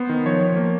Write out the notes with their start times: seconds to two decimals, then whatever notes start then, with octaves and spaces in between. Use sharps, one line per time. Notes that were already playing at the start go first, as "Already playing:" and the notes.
Already playing: B3 C5
0.09 D#3
0.25 F3 C#5
0.41 F3
0.57 A#3